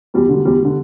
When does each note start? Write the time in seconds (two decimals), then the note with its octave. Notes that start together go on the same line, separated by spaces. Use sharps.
0.14 E2 G3
0.29 D3
0.34 G3
0.45 E2 G3
0.60 D3 G3